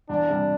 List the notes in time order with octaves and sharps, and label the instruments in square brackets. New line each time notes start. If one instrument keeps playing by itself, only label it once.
[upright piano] E2 [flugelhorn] D4
[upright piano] C3 G3